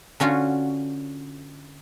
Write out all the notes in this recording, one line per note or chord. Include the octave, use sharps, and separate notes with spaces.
D3 C#4 F4 F#4